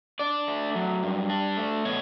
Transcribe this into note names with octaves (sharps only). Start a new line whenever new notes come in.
D4 D5
A3
F#3
G2
D4
A3
B2 C#5